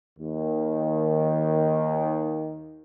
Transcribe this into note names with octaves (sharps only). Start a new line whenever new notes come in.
D#2 D#3